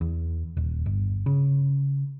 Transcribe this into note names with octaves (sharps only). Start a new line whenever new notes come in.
E2
D#1
G1
C#3